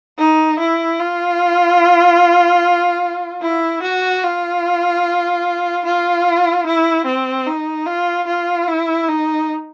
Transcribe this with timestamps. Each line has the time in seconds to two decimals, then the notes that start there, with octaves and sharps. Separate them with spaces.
0.19 D#4
0.60 E4
1.00 F4
3.42 E4
3.83 F#4
4.24 F4
5.85 F4
6.67 E4
7.06 C4
7.47 D#4
7.87 F4
8.27 F4
8.68 E4
9.09 D#4